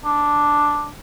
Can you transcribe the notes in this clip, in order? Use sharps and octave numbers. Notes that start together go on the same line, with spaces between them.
D4